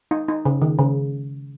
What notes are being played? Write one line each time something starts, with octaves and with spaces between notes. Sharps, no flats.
D#4
D#4
C#3
D#3
C#3